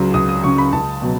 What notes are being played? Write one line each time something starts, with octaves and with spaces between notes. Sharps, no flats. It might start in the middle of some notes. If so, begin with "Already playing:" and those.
Already playing: C#2 C#3 F#3
C#2 D#6
D#6
C#3 F#3 C#6
B5
C#2 A5
B2 F#3